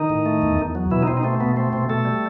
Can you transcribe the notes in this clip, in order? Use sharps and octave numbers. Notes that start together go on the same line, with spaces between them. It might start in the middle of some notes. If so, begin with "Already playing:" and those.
Already playing: D#3 D#4
A2
A3
E2
E2
F#3
B2 E3 E4
D#4
B2 C4
D#4
A3 C4
B2 B3
A3 C4
B2 C4
B2 A3 A4
G3